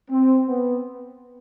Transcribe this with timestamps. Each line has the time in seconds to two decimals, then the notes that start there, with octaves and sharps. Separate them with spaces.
0.10 C4
0.47 B3